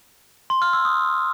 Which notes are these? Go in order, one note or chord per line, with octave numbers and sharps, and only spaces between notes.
C6
F6
E6
D#6